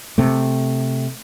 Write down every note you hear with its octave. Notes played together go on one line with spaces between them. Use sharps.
C3 A3